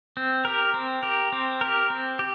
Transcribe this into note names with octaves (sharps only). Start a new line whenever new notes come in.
C4
G4 A#4
C4
G4 A#4
C4
G4 A#4
C4
G4